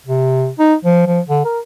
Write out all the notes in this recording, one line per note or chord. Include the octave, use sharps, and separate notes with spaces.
C3
D#4
F3
F3
D3
A#4